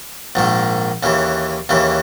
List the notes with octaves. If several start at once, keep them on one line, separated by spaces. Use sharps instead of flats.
A#1 G#2 D#3
D#2 C#3 E3
D#2 C#3 E3